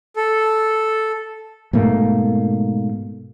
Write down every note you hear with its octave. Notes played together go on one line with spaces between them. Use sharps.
A4
G#2 B2 A3 A#3